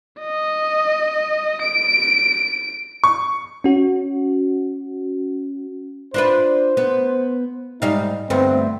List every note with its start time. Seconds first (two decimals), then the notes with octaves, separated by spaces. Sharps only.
0.20 D#5
1.62 D7
3.04 C#6
3.64 C#4 F#4
6.14 D4 F4 B4 C5
6.77 B3
7.82 G#2 G3 D#4 F5
8.30 D2 G2 B3 C4